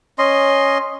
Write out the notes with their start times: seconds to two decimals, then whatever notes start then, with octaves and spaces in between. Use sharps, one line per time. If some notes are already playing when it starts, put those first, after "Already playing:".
0.18 C#4 D#5 C6